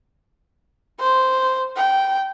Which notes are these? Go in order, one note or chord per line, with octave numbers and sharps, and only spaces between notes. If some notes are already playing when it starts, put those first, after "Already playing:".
C5
G5